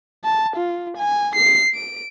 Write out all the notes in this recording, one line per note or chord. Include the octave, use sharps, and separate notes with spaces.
A5
F4
G#5
C7
D7